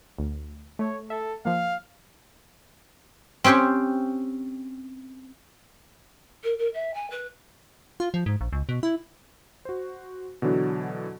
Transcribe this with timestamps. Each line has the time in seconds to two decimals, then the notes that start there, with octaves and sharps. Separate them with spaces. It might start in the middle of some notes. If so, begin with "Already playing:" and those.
0.18 D2
0.79 A3 C#5
1.10 A4 E5
1.45 F3 A#3 F5
3.44 C4 C#4 G4 C5 C#5
6.44 A#4
6.58 A#4
6.74 E5
6.94 G#5
7.11 B4
8.00 F4
8.14 F3
8.26 G#2
8.41 A#1
8.53 C#2
8.69 B2
8.83 E4
9.65 F#4 C5
10.42 B2 D3 E3 F#3 D4 F#4